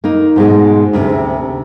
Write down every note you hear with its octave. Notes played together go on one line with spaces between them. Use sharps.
A#3 D#4
G#2 B2 G#3
D2 C3 C#4